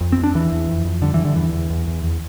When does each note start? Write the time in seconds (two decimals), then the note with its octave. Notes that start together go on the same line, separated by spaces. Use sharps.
0.01 F2
0.12 C4
0.17 F2
0.24 D4
0.35 E2 E3
0.52 E2
0.69 F2
0.85 F2
1.02 G2 D3
1.14 E3
1.19 G2
1.25 D3
1.35 E2 E3
1.53 E2
1.70 E2
1.87 E2
2.04 E2